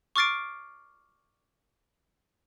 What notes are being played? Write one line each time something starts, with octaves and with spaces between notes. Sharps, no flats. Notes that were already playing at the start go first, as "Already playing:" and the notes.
C#6 D6 F6 A6 C7 D7